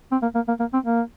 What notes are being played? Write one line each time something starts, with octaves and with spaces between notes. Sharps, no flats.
C4
A#3
A#3
A#3
A#3
C4
A#3